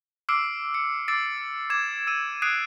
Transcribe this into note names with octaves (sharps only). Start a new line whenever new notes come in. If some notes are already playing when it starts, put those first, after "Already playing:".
D6 E6 F6 C7 D7
C#7
D6 E6 A6 C7 D7
D6 G#6 E7
E6 D#7
D#6 F#6 G#6 C7 D7 D#7